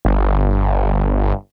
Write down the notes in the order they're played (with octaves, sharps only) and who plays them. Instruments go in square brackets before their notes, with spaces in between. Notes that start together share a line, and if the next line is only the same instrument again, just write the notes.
[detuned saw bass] G1